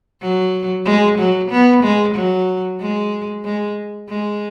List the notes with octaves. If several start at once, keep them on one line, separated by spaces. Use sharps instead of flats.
F#3
G#3
F#3
B3
G#3
F#3
G#3
G#3
G#3